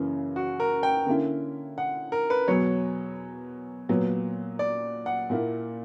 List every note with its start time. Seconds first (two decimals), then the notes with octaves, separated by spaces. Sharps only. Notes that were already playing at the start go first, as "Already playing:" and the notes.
Already playing: F#2 C#3 E3 A#3
0.36 F#4
0.60 A#4
0.83 G5
1.06 D3 A#3 C#4 E4
1.78 F#5
2.12 A#4
2.30 B4
2.48 E2 B2 F#3 C#5
3.89 A#2 F#3 B3
4.59 D5
5.06 F#5
5.30 A#2 A#3 E4